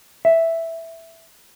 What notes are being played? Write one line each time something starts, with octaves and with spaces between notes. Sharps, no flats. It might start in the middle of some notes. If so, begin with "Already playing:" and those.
E5